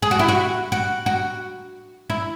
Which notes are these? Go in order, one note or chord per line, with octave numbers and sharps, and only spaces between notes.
G#4
F#4
E4
F#4
F#4
F#4
E4